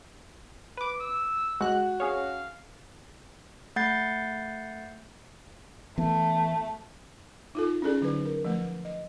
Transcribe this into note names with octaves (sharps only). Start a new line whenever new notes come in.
B4 D6
E6
G#3 F#4 F#6
C#4 G#4 C#5 F5
A3 F#5 G6 A6 C7
E3 A3 B3
D#4 F4 A4
C#4 E4 G#4 A4 D5
D3 F#3 D#4 B4
A#4
F3 A3 B4
D#5